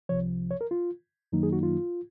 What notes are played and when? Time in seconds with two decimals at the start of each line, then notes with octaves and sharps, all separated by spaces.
0.09 C2 C3 F3 C#5
0.51 C#5
0.61 A#4
0.71 F4
1.32 F#2 D#3 F#3 A#3 D#4
1.43 G#4
1.53 F#4
1.63 F4